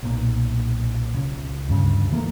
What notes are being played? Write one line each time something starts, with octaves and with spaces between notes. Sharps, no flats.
B1 A#2
C#2
D2 G2 C#3
E3 A3 A#3